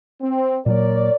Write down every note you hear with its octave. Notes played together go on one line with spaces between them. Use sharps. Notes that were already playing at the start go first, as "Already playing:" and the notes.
C4
A#2 F#3 A#3 A#4 C#5 D5